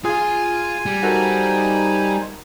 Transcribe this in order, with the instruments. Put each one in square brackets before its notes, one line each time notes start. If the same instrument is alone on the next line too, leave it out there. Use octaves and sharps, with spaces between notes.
[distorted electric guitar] F4 F5 [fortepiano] G#4 [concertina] G#5
[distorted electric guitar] G3
[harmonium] D#4 C5 [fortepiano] F#4 A4 A#4